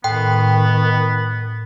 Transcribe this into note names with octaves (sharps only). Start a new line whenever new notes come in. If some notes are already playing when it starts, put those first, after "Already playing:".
A2 D#3 B3 G5